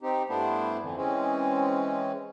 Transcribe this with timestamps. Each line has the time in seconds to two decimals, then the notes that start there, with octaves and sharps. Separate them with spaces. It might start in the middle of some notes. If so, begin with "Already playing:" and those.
0.02 C4 D#4 G4
0.29 G2 A3 B3 D4 E4 C5
0.83 F2 D3 E3
0.97 E3 G#3 C4 C#4